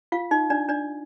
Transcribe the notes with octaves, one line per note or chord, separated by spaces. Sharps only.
F4 F5
D#4 D#5
D4 D5
D4 D5